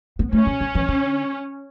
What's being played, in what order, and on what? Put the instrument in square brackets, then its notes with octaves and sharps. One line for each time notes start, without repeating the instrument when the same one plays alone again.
[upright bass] B3
[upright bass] A3 [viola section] C#4
[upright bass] C#3
D3
E3
D3